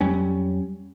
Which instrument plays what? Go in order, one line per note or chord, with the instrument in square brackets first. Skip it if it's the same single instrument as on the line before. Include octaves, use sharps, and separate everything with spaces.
[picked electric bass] F2 F#3 G3 C#4